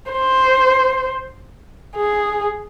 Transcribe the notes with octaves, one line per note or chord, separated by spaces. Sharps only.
C5
G#4